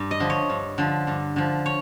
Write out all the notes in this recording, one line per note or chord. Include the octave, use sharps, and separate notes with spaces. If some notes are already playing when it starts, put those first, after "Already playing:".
Already playing: G2
D#5
D3 F3
C#5
G2
D3 F3
G2
D3 F3
C#5